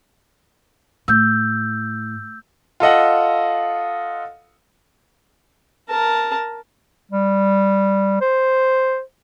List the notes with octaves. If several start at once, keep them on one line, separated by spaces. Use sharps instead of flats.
A2 E6 G6
F4 A4 D#5 F#5
A#4 A5
G3
C5